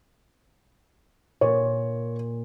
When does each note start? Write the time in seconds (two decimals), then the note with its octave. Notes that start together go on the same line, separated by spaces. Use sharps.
1.41 A#2 C#5